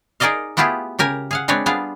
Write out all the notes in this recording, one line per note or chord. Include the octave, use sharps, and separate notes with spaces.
D#4 G#4 A#4 D5 D#5 F5
A3 B3 E4 F4 G4 G#4
C#3 G4 A#4 G#5
G#4 F5 F#5
G#3 C4 D4 B4 C#5
G3 B3 D4 F4 G#4 F5